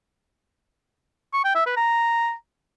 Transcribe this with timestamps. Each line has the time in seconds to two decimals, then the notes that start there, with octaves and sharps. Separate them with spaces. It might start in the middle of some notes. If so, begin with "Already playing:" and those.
1.34 C#6
1.45 G5
1.55 E5
1.66 B4
1.77 A#5